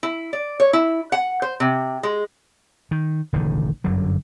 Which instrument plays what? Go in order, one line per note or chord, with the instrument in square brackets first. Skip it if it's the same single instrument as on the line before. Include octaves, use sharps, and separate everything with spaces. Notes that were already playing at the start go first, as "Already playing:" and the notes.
[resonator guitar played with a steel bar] E4
D5
C#5
E4
F#5
C5
C3
G#3
[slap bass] D#3
E1 A1 D3 D#3
G1 F#2 D3 F#3